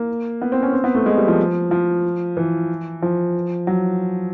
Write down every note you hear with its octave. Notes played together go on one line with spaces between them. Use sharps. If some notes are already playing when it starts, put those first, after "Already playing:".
Already playing: A#3
B3
C4
C#4
C4
B3
A3
G#3
G3
F3
F3
E3
F3
F#3